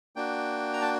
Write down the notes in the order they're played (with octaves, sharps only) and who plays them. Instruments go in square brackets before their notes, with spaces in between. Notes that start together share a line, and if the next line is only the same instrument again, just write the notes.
[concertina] A#3 D4 F#4 G5
A#5
A5